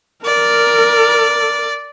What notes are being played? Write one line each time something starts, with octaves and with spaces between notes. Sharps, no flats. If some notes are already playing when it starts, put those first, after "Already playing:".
A#4 D5